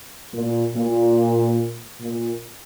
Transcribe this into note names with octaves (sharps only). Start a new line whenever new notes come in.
A#2
A#2
A#2